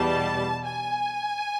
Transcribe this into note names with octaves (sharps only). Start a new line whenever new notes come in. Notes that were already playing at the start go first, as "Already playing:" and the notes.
Already playing: E2 B2 G3 A5
G#5